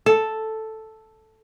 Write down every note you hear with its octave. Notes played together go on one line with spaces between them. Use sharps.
A4